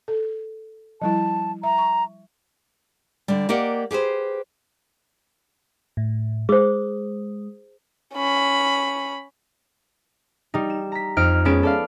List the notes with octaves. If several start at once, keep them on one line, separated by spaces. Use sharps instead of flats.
A4
F3 G3 E4 A5
E5 A#5
C#6
D3 G3
A#3 G4 A#4 D5 D#5 F#5
G4 G#4 B4 C5
A2
G#3 G#4 C5
C#4 B5
G3 D#4
E7
A#5 B6
F2 D#4 F6 D7
G#3 B3 C#4 A6 D7 E7
A4 D5 F5